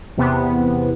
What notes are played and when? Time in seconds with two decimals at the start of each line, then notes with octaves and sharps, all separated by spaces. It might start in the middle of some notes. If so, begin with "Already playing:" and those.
0.17 E2 C3 B3